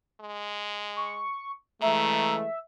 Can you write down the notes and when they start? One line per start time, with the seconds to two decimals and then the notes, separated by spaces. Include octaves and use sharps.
0.21 G#3
0.96 C#6
1.82 C#3 E3 G#3 A3 E5 A#5